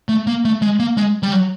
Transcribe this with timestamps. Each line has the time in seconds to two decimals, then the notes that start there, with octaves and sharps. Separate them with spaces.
0.09 A3
0.27 A#3
0.45 A3
0.62 G#3
0.80 A#3
0.97 G#3
1.23 G3
1.32 F#3